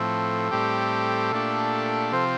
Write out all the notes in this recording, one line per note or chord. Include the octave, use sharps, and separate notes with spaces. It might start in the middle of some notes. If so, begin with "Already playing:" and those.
Already playing: A2 F3 C4 A4
A2 G3 C4 G4
A#2 A3 D4 G4
C3 F3 C4 F4 C5